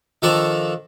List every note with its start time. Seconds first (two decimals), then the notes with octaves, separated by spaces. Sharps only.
0.22 D#3 F3 D4 A4 A#5 C#6